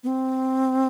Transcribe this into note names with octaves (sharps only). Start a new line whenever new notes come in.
B3
C4